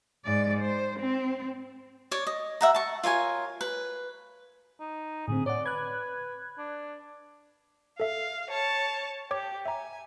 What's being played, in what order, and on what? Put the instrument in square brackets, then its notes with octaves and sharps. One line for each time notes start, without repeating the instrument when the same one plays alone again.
[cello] G#2 D5
C5
C4
[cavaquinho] C#5 D5
D#5
E5 F#5 A#5
A5 C#6
F4 A#4 C#5 G#5
B4
[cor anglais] D#4
[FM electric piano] A2 D3 C4 [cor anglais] G#4
[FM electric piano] C#5 F#5 [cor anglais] D5
[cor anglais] B4 [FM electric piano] F#6 G#6
[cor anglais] D4
[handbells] A4 E5 [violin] F5
[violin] C#5 A5
[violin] G4 [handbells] C#5 D6 G#6
[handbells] E5 A#5 [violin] G#5